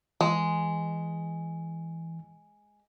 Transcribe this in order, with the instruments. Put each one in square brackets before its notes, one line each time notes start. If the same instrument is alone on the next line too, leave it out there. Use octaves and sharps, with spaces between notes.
[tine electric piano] E3 [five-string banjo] G#3